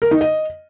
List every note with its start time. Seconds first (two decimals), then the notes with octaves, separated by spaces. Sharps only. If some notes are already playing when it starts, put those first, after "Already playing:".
0.02 A#4
0.11 D#4
0.21 D#5